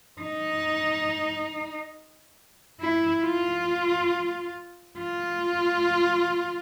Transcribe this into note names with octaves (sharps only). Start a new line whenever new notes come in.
D#4
E4
F4
F4